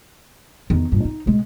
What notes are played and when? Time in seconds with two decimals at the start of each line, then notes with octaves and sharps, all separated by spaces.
0.70 E2 D#3
0.92 G2 A#2
1.05 D#4
1.26 B2 G#3